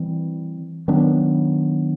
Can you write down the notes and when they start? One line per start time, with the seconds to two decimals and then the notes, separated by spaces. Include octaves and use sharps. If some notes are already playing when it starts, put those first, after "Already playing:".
Already playing: E3 G3 C4
0.88 D#3 F#3 B3 D4